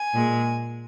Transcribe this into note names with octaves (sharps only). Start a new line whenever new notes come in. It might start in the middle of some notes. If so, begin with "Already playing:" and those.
Already playing: G#5
A#2 G#3